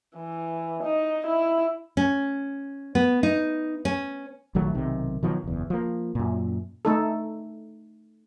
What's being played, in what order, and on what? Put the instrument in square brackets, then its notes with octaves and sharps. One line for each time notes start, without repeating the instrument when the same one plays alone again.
[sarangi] E3
D#4
E4
[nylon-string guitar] C#4
B3
D#4
C#4
[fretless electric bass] A#1 D#3 F#3 A3
B1 C3 D#3
B2 D#3 F3 F#3
F#1 E2
F3 A#3
F#2 A#2
[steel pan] A3 D#4 A4